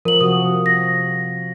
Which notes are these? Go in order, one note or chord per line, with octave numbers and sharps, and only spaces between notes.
F3 A#4 F#7
C3 F#4 D#6
A#6